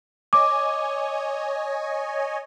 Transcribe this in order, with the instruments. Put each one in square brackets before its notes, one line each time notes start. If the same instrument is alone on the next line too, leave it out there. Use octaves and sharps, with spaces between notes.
[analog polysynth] C#5 D#5 G#5 [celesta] D6